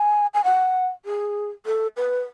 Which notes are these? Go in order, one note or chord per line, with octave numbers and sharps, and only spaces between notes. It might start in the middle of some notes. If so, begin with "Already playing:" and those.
Already playing: G#5
G#5
F#5
G#4
A4
B4